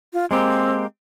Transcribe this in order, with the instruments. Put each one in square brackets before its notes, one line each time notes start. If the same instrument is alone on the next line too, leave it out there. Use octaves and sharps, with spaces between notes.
[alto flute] F4
[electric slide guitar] G#3 A#3 G4 [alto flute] C4